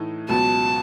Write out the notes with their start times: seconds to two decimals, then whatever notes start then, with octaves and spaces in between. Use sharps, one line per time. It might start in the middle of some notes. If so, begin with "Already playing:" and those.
Already playing: A2 E3 A3 D#4
0.28 C#2 B2 F#3 B3 A5